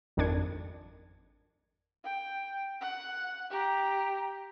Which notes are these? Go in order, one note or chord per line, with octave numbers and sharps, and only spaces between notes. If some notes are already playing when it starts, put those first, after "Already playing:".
G#1 F2 D#3 D4 G#6 C#7
G5
F#5
G4 A#5